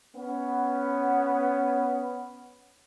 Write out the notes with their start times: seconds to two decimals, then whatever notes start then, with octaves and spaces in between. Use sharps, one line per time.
0.15 B3 C#4